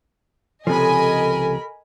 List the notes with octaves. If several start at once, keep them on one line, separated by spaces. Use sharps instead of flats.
C#2 C3 F3 A4 A#4 D#5 G#5 B5